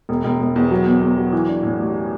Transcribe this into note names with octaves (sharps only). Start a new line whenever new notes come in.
E1
E1
E1
E2
F#3
E2
E2
F#3
E3
D4
A2
A1